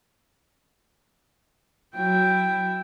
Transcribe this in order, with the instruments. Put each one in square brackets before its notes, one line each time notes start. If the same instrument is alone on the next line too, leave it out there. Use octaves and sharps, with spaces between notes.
[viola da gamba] F#3 [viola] E4 G5